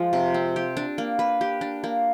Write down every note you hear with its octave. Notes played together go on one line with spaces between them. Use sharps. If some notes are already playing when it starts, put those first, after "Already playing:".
Already playing: F3 G#3
C3
C4
G4
D4
A#3
B4
G4
D4
A#3